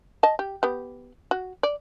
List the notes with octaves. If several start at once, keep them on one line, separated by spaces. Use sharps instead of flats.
D#5 A5
G4
B3 G4
F#4
D5